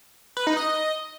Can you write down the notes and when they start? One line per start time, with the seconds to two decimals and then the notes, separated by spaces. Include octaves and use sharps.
0.37 B4
0.47 D#4
0.57 D#5